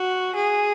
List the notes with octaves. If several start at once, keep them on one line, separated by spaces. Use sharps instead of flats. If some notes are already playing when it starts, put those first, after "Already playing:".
Already playing: F#4
G#4